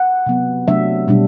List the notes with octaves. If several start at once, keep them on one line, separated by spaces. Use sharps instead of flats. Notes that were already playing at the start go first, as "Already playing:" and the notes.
Already playing: F#5
C3 F#3 B3
C3 F#3 A3 D4 E5
B2 G3 D4